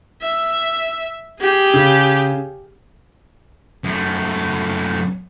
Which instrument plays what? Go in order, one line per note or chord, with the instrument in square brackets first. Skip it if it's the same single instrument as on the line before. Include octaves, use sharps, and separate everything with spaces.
[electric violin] E5
G4 G#4
[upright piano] C#3
[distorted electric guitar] F#2 A3